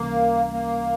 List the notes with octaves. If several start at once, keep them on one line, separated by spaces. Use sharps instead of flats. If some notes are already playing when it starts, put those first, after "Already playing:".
Already playing: C#2 C3 E3 G3 A#3 C#4
A#3